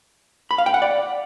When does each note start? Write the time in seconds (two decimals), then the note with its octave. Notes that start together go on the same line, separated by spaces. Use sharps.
0.51 B5
0.58 F5
0.66 G5
0.74 F#5
0.82 D5